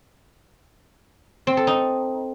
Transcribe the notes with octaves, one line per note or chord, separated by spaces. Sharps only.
C4
A4
D#4